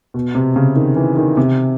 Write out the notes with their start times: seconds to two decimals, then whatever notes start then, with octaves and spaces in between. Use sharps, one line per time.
0.14 B2
0.35 C3
0.56 C#3
0.76 D#3
0.96 E3
1.17 D#3
1.37 C3